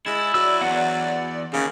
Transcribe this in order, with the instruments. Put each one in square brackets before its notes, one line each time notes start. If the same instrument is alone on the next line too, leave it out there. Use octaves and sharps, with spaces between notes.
[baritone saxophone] G#3 [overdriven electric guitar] E4 [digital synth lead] A6
[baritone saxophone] F#3 [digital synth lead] D5 [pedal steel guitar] E6
[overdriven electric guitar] E2 E3 [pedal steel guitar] F#5
[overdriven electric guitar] D#2 [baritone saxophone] C#3